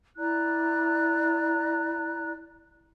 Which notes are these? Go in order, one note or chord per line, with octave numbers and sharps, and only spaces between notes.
E4 D5 A#5 F#6